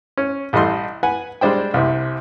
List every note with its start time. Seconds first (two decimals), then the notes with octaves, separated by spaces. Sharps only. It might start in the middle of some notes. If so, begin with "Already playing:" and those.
0.17 C#4
0.53 A1 G3 A4 D#5 C6
1.03 B4 F#5 G#5
1.41 G3 G#3 D4 C5 G5
1.74 C2 C3